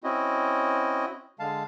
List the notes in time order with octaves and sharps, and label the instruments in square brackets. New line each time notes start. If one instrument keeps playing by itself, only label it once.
[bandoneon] C4 C#4 E4 F#4 D#5
D3 G#3 F5 A5